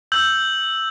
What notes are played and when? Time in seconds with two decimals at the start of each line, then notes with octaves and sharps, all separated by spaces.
0.12 E6 G6 F#7